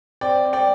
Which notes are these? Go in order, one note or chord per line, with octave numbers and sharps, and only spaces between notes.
C4 D5 G5
C4
D5 G5